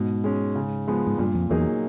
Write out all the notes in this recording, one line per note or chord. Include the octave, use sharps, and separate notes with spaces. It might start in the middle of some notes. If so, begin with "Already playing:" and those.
Already playing: G#2 B2
G#3 C#4
C#3
F3 G#3 B3
G#2
G2 A#2
F2
E2 F#3 A#3 D#4 G#4